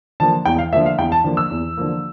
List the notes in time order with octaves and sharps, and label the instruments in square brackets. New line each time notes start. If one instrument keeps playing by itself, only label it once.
[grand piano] D3 F3 A#3 A5
E2 G5
F5
D3 F3 A#3 E5
F5
E2 G5
A5
D3 F3 A#3
E6
E2
D3 F3 A#3